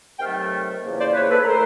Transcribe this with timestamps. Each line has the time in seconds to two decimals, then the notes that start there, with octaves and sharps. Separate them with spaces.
0.19 C3 D#3 F#3 A3 F5 G5
0.83 E2 C#3 F3 A#3
0.98 C5 D5
1.14 B4 C#5
1.30 A4 B4
1.45 E3 A3 A#4 C5